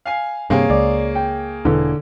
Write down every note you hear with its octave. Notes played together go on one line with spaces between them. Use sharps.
F5 G#5 C7
G2 C3 A#3 G#4 C#5
C#2 D5
G5
E1 D3 E3